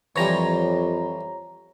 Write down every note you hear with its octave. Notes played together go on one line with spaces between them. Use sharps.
F2 E3 F3 G3 C#5 A#5